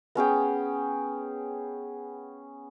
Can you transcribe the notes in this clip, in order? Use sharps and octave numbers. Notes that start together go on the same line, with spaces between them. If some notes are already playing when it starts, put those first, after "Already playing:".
B3 C#4 G#4 G5